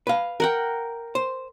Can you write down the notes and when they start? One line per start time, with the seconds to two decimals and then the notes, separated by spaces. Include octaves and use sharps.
0.07 B4 F5
0.40 A#4 F#5 G5
1.15 C5